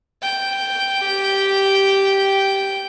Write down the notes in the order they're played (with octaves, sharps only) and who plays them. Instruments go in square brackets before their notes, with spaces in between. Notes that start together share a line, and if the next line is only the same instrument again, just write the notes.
[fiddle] G5
[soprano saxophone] G4